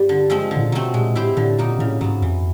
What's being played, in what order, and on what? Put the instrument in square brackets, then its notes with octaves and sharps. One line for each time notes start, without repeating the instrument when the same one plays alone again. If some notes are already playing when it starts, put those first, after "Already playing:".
Already playing: [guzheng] G2 G3 C4 F4
D3
F3 G#3 C4
D3
[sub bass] A2
A#2
[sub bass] B2 [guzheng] F#3 A3 C4
[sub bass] A#2 [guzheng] G#3
[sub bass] A2 [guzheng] C4 E4 G4 C5
[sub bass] A2 [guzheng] D3
[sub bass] A#2 [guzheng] F#3 A#3 D#4
[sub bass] A2 [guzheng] C#3
[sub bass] G#2 [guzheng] F#3 B3
[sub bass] F2 [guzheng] E3